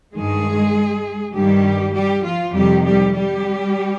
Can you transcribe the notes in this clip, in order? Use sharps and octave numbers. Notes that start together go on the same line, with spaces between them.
G2 D#3 G#3 G#4
G2 D#3 G3 G4
G3 G4
F3 F4
F2 C3 D#3 G3 G4
G3 G4
G3 G4